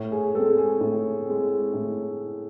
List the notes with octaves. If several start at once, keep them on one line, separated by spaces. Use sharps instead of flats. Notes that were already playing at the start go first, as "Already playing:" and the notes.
Already playing: A2
G#4
G#3 C4 A4
G#4
A2
G#3 C4
A2